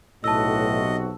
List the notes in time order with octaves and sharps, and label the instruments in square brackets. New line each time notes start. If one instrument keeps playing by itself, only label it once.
[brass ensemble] B1 C3 F#4 [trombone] A2 [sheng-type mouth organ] D#5 [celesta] A5 E6